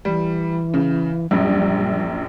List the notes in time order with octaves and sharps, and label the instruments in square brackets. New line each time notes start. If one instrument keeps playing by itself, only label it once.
[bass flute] E3 [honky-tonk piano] G3
[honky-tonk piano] C#3
[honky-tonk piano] A#1 F#2 [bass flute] G3